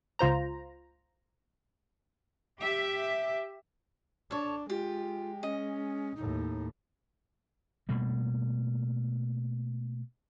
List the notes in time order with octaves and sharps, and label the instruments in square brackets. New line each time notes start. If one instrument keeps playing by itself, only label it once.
[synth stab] C#2 F4 C5 A#5
[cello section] G4 E5
[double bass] D4 [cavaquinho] A4 C#5
[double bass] G#3 [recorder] F4 [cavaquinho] G4
[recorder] C#4 [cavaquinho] D#5
[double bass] D#2 A2 [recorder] D#4
[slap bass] B2 G3 A3 A#3